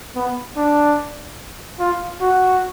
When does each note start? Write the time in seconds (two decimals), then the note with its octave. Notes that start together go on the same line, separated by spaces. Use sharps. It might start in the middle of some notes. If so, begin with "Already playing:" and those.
0.16 B3
0.57 D4
1.80 F4
2.21 F#4